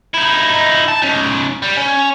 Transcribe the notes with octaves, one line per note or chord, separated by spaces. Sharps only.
D#4 E4
A5
C#4 D#4
G3
C#4